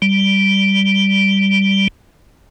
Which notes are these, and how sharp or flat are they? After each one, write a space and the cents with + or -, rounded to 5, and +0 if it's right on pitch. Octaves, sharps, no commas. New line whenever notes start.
G3 -5